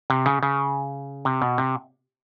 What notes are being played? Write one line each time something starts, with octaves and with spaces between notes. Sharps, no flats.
C3
C#3
C#3
C3
B2
C3